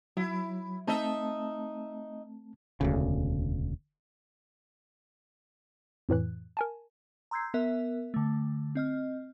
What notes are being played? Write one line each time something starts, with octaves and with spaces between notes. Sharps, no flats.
F#3 E4
A3 C4 D#4 D#5 E5 A5
E1 D2 C#3
F2 A2 E3 F#6
A#4 G#5 A5
A#5 C6 E6 G6 G#6 C7
B3 A#4 E5
D3 A3
C4 D#5 F6